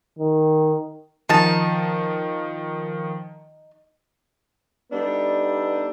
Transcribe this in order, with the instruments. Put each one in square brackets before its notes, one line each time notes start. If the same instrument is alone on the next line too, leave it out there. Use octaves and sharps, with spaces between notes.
[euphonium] D#3
[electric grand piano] D#3 F3 [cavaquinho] D#4 A5
[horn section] G3 B3 D4 D#4 A4